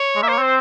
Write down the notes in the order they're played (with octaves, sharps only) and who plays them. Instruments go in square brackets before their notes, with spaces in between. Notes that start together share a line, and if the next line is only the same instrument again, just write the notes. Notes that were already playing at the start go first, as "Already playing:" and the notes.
Already playing: [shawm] C#5
[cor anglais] G#3
[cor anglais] A#3 [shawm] E5
[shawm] C5
[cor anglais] C4 [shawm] C#5
[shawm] C5